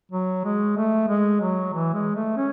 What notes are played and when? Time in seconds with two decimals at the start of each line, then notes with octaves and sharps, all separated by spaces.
0.12 F#3
0.44 G#3
0.77 A3
1.08 G#3
1.41 F#3
1.73 E3
1.94 G#3
2.15 A3
2.37 C#4